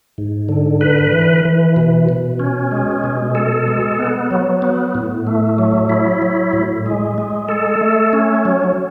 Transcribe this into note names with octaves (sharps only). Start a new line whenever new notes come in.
G#2
D3
B4
E3
E3
B2
B2
C#4
G#3
B2
A4
G#3
B3
F#3
B3
A2
A3
F#3
E4
F#3
A2
G#3
G#3
A4
A3
C#4
F#3